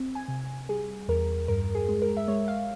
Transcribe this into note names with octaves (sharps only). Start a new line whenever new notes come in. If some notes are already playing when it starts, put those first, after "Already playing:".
Already playing: C4
G#5
C3
G3 G#4
E2 A#4
G2 A#4
G#4
G#3
A#4
E5
G#3 C#5
F5